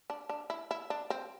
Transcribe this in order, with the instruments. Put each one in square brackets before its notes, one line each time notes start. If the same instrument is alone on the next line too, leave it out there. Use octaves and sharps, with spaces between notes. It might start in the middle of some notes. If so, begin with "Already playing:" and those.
[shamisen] D4
D4
E4
E4
D4
C4